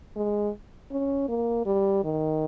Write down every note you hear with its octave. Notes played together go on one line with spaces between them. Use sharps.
G#3
C#4
A#3
G3
D#3